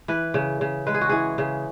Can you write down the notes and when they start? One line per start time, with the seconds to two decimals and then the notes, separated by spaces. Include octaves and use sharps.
0.08 E3 B4
0.34 C#3
0.61 C#3
0.87 G#3 B4
0.94 G#4
1.01 F#4
1.09 E3 G#4
1.38 C#3